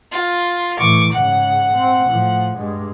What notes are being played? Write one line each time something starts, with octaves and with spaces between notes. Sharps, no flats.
F4
A2 E3 C#6 D6
G#2 C#3 F#5
C4
A2 F3
G2 G#3